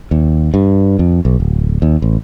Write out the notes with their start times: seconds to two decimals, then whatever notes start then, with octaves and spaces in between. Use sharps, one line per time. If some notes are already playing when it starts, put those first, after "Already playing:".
0.11 D#2
0.54 G2
0.99 F2
1.25 B1
1.40 D1
1.82 D#2
2.02 A1